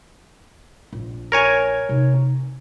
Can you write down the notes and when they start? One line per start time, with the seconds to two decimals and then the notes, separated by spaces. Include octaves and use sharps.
0.93 A#1
1.32 A#4 C#5 G#5
1.89 C3 D#4